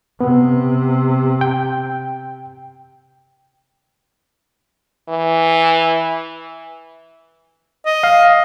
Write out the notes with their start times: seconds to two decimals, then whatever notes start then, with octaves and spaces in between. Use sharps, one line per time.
0.21 C3 B3
1.41 G5
5.09 E3
7.86 D#5
8.03 F5